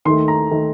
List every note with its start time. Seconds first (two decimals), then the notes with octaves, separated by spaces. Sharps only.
0.05 D#2 D#3 A3 C6
0.28 A#5
0.51 D#3 A3